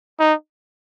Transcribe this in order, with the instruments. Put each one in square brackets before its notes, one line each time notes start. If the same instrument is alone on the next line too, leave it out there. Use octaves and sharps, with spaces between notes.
[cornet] D#4